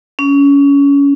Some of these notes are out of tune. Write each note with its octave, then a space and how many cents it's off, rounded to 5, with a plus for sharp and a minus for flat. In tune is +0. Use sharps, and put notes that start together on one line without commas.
C#4 +25